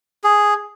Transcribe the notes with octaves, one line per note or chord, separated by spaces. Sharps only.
G#4